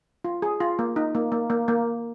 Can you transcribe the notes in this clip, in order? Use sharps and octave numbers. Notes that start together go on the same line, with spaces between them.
F4
G#4
F4
A#3
D#4
A#3
A#3
A#3
A#3